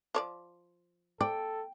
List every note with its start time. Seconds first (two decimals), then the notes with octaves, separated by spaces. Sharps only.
0.15 F3 C#5 D5
1.21 A4 D5 G5